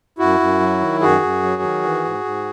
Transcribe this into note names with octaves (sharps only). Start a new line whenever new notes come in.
F#2 E4 F#4
F#2
F#3
D#3
F#2 F#4 G#4
F#2
F#3
D#3
E3
G#2
G#2